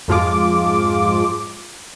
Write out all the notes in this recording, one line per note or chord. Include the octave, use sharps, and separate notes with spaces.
F2 G#2 F3 G#3 F4 D6